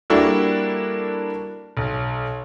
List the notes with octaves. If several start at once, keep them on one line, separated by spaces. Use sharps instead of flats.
G3 A#3 D4 E4 F#4 A4
B1